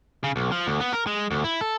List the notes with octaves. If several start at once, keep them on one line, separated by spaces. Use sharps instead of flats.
C#3
B1
F3
D2
B3
A#4
G#3
D2
E4
A4